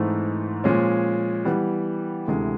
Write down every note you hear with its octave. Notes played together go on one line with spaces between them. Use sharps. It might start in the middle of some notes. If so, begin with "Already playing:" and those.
Already playing: G#2 E3 A3 C4 D#4
A#2 F3 G#3 C#4
E3 G3 B3
D2 C3 E3 G#3